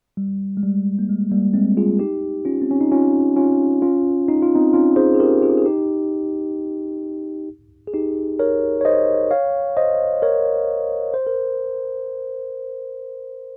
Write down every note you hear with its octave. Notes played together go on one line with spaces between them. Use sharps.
G3
G#3
G3
A#3
G#3
G3 A#3
G#3 C4
F4 G#4
D#4 G4
C#4 F4
C4
C#4
D#4
C#4 F4
C#4 F4
C#4 F4
D#4
F4
C4 D#4
C#4 F4
G#4 C5
G#4
G4 A#4
F4 G#4
G#4
D#4 G4
G#4
D#4 G4
A#4 C#5
C#5
C5 D#5
C#5 F5
C5 D#5
A#4 C#5
C5
A#4